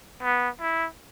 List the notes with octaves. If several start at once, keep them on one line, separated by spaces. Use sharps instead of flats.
B3
E4